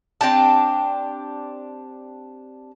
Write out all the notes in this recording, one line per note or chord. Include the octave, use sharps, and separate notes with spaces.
C4 D4 G4 A5